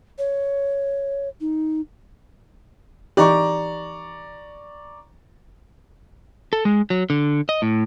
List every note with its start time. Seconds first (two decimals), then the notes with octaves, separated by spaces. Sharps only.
0.18 C#5
1.41 D#4
3.17 E3 D#4 G4 D5 A#5 C#6
6.53 A4
6.65 G#3
6.90 F#3
7.10 D3
7.49 D#5
7.62 A2